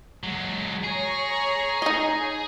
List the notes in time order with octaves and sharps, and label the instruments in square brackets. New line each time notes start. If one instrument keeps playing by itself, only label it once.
[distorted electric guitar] F#3 G#3
[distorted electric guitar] G#4 [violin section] C#5 A#5
[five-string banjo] D#4 D#5